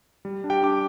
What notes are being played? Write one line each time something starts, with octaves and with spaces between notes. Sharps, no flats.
G3
D4
G4 G5
D4 D6